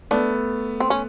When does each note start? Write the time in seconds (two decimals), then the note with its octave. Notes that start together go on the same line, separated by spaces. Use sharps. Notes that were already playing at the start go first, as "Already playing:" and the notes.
0.11 A3 B3 D4
0.80 C4
0.90 C#4